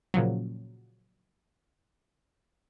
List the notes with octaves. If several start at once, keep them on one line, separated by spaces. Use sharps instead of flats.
A#2 C#3 F3 F#3